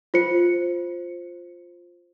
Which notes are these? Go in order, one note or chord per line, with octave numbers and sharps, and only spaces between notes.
F4 C5 C#7